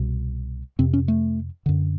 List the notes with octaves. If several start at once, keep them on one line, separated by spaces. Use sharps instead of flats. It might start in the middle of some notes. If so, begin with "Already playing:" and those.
Already playing: C2 B2
F2 C3 C4
C#4
A3
F#2 D3